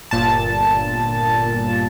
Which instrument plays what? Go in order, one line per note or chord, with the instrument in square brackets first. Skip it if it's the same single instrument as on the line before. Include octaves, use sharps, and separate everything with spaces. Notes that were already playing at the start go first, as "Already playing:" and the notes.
[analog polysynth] G1 A#2 A5